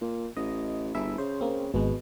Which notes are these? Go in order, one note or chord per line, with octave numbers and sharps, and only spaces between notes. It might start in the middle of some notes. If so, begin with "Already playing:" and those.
A#2
A1 D#5
G1 E4 G#4 E5
C#3 C5
A#3 C4
G#1 B2 G#3